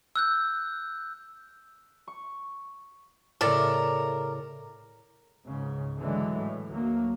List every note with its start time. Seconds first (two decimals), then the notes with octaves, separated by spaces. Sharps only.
0.16 E6 F#6 G6
2.07 C#6
3.41 A2 C#3 A4 A#4 D5
5.45 C#2 G#2 C#3
5.99 D3 E3 F#3 G#3
6.37 A2
6.70 D2 F#3 A#3